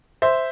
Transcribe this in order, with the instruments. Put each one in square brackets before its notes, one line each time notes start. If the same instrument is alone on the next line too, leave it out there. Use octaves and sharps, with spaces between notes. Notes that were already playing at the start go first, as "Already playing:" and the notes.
[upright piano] C5 E5